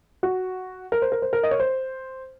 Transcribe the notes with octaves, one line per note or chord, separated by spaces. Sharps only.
F#4
A#4
C5
A#4
C5
A#4
D#5
C#5
C5